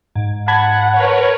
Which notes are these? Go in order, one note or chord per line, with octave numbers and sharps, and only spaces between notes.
G#2
F#5 A5 B5 G#6
A#4 B4 C#5